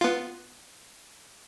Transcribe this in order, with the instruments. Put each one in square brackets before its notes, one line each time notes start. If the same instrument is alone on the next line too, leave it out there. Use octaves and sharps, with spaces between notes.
[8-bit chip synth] B3 F4